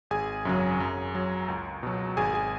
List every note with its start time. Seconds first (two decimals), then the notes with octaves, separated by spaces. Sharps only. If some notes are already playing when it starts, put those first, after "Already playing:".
0.11 G#1 G#4 G#5
0.45 F#2 C#3 F#3
0.80 F#2
1.15 F#3
1.48 C#2
1.83 B2 F#3
2.17 G#1 G#4 G#5
2.34 G#4 G#5